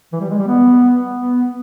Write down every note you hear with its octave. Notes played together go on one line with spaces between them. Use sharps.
E3
G3
G#3
G3
B3
B3